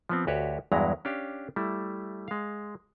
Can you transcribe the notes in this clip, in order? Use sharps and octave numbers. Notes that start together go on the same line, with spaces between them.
F3 B3 C4
D2 F#4 G4 B4 C#5
E2 G2 F#3 G#3 E4 A#5
C#4 D4 G4 F5
G3 A3 E4
G#3 F5